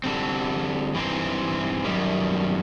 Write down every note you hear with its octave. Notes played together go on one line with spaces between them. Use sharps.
D3 G3 C4
G2 E3 C4 D#4
F#2 D#3 G3